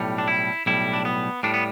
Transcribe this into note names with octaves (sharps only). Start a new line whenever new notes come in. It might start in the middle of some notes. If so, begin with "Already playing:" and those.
Already playing: B1 A2 G3
D4
E4
B1 A2 G3 E4
D4
B3
A2 G3 D4
B3